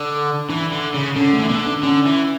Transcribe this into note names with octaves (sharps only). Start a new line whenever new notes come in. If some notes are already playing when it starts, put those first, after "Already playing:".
Already playing: D3
E3 D4
D3
C#3
D3 C#4
A3
E3
D3 B3
D4
D3 C#4
E3